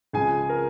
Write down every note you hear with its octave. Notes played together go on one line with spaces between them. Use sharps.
C#2 C#3 F3 G#4 G#5
A#4